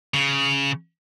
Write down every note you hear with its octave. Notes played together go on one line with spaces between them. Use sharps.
C#3